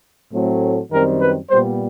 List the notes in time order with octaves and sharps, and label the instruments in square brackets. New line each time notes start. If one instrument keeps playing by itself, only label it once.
[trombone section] A2 F#3 A3 C4
F#2 D#3 G3 C4 A#4
B4
A#2 G3 B3 C5